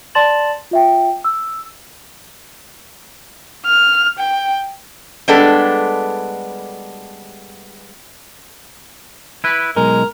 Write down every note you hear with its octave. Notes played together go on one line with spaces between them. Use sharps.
D5 A5 C6 A6 E7 F#7
F4 E5 G5
E6
F6
G5
G3 G#3 B3 D4 A4
E4 B4
B1 G#3 A#4